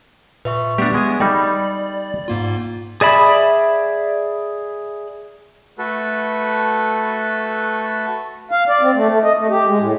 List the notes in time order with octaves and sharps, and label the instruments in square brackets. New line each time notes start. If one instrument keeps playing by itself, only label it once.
[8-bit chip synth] A#2 [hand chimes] B4 E5 C#6
[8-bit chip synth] G3 A3 B3 [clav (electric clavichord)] D4 G4
[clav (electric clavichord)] G#3 G#5 [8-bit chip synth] B3
[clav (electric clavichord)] G3 D#4 A4 [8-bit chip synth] D5 [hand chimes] G5 B5
[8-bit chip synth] G#2 A#3 F4
[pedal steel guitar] G#4 D5 E5 B5
[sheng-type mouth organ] A3 F#4 A4 B4
[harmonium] F5
D5
C4
A3
A3
D#5
A3
G4
G#3
A2